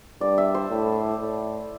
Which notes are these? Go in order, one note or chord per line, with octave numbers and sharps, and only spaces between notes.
G2 D5
E5
C5
A2
A2